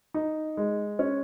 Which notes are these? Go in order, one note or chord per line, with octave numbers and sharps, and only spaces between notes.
D#4
G#3
C#4